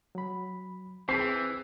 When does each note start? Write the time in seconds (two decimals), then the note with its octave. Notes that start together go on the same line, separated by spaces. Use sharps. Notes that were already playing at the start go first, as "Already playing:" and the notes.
0.15 F#3 B5
1.09 E3 C4 G#4 G6 B6 C7